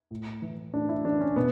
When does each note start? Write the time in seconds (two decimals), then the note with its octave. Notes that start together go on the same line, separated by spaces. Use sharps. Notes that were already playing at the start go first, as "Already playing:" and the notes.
0.11 A2
0.42 E3
0.74 A2 D4
0.89 E4
1.05 E3 D4
1.21 C#4
1.36 B2 B3